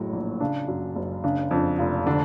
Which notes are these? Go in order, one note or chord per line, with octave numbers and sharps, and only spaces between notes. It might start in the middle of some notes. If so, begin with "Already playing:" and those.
Already playing: F#1 A2 F#3
A#1
C#3 D4
F#2
F#1
C#3 D4
F2 D4
F1 F4
D3 D4